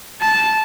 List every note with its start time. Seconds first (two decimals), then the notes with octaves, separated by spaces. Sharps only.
0.21 A5